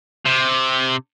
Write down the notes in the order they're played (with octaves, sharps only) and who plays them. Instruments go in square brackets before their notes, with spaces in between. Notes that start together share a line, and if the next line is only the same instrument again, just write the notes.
[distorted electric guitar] C3